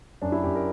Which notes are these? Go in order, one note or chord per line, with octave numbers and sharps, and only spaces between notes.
F#2 D4
E4
F#2 G4
A#4